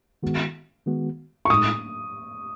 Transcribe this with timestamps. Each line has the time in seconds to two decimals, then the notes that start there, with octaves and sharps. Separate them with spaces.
0.23 D#3 G#3 B3 F#4
0.86 D#3 G#3 B3 F#4
1.45 C#6
1.50 A2 G#3 D#4 D#6